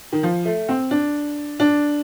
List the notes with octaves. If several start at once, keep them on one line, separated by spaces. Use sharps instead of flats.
D#3
F3
A3
C4
D4
D4